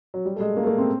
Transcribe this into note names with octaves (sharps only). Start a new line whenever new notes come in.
F#3
G3
A3
G#3
A#3
A3
A#3
C4